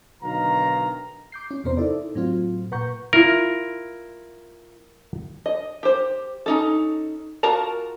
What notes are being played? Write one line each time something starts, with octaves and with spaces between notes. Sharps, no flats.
B1 D3 D#3 B4 F5 A#5
D6 G6 C7
C#4
E2 C3 B3 A#4 C5
D#4 E4 A4 D5
A2 F#3 C4 F4
A#2 B4 F#5 A#5 C#6 G6
E4 F4 A#4
D#5
G4 C5
C#4 D#4 A4
F4 F#4 A#4 A5 A#5